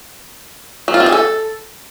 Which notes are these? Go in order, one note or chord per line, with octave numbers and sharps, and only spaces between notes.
F#3
F4
C4
G#4
A4